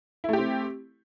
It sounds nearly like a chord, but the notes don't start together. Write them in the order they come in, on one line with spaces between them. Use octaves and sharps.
E4 A3 G4 C4